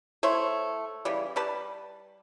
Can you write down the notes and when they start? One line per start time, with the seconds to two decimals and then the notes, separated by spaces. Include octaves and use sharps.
0.23 A3 E4 C5 C#5
1.05 C#3 E3 G3
1.36 G3 G4 B4 A5